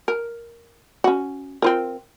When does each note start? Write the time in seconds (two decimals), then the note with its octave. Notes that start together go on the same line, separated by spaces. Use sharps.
0.08 A#4
1.04 C#4 F#4
1.62 C4 F4 A#4